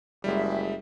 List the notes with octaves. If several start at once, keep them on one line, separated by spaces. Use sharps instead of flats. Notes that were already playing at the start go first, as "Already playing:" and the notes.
F#1 G3 G#3 E5